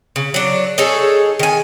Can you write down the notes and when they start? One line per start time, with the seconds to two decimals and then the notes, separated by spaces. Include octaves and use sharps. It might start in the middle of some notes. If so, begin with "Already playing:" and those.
0.16 C#3
0.34 F#3 D4
0.78 D#4 G#4 A4 C#5
1.39 D#3 G#5